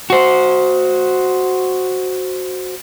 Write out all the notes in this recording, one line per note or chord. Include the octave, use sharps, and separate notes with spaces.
F#4 C5